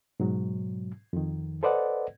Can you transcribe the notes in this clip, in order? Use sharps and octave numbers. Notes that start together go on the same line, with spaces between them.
G#2 B2 F#3
F2 D#3
A4 B4 C5 D5 D#5 F#5